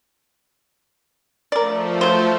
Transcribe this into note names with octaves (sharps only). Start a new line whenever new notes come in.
F3 A3 A#4 D5
F#3 C5